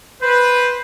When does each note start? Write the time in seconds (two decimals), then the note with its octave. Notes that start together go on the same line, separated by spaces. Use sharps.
0.22 B4 C5